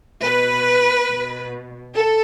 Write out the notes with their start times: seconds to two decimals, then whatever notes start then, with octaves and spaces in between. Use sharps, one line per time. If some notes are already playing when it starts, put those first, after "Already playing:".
0.22 B2 B4
1.08 B2
1.93 A4